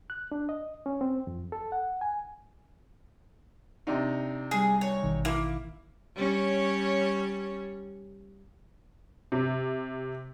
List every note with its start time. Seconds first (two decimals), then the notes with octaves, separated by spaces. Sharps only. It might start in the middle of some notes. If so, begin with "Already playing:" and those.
0.10 F#6
0.32 D4
0.49 D#5
0.86 C#4
1.01 C4
1.27 F2
1.52 A4
1.72 F#5
2.01 G#5
3.87 C3 D4 D#4
4.51 G3 G#4 G#5
4.81 C#5
5.03 A1 B2 D#3
5.25 A#3 E4
6.16 G3 C#4 C#5
9.32 C3